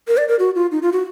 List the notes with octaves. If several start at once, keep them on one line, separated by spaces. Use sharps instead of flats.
A#4
D5
A#4
F#4
F4
D#4
F4
F#4